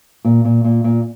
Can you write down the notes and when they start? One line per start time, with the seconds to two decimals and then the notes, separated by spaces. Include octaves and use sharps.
0.25 A#2
0.45 A#2
0.64 A#2
0.84 A#2